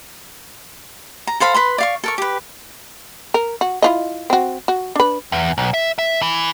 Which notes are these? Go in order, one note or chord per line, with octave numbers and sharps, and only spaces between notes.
A#5
A4 C5 F5 B5
B4 B5 C6
D5 F5 C#6
A4 A#4 C#6
G4 B4
A#4
F#4
E4 F4 D#5
C4 F#4
F#4
D4 B4
E2
B1
E5
E5
E3